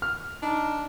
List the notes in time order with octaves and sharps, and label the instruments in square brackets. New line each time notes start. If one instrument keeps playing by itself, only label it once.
[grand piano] F6
[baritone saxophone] D4 [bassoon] D#4